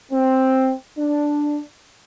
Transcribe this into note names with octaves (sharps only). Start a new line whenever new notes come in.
C4
D4